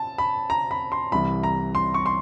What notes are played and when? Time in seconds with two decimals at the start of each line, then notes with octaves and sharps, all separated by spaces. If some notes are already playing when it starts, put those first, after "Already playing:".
Already playing: A5
0.18 B5
0.50 A#5
0.71 B5
0.92 C6
1.12 C2 C3 E3 G3 B5
1.43 A#5
1.75 C6
1.94 C#6
2.06 C6